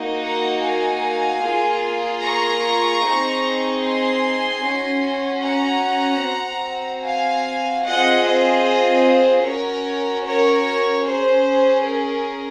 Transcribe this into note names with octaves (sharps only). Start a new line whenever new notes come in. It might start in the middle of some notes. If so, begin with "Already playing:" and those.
Already playing: A#3 D#4 F#4
F#5 A#5
F5 G#5
A#3 F4 G#4
A#5 C#6
C4 D#4 G#4
G#5 C6
C#4 F#4
F#5 A#5
C4 F#4
F5 G#5
C4 F4 G#4 D#5 F#5
C5 D#5
C#4 F#4 A#4 C#5
A#4 C#5
C#4 G#4 C5
A#4